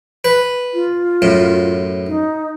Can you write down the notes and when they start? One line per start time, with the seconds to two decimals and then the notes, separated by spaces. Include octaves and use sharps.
0.24 B4
0.73 F4
1.22 F#2 A2
2.08 D#4